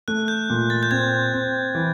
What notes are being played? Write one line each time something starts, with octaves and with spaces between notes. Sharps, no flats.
A3 F#6
G6
A#2
A6
G6
C4 G#6
C4
E3